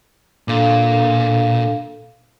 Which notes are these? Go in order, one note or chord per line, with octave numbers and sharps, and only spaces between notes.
A#2 D4 A4 F5